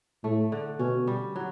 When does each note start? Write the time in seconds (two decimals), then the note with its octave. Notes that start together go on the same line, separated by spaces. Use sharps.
0.24 A2 A3
0.52 D3
0.79 B2 C#4
1.07 G3
1.36 F#3